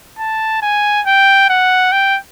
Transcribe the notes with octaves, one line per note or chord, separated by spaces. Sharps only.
A5
G#5
G5
F#5
G5